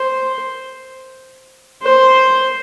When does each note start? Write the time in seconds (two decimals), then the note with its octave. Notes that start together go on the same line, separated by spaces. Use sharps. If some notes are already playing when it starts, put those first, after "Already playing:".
Already playing: C5
1.82 C5